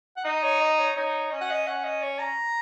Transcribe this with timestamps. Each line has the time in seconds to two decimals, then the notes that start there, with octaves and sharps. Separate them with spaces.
0.17 F#5
0.25 D#4 D#5
0.43 C#5
0.61 D#5
0.79 C#5
0.96 D#4 C#5
1.31 C#4 D#5
1.41 F#5
1.51 D#5
1.67 C#4 F#5
1.84 D#5
2.02 C#5
2.20 A#5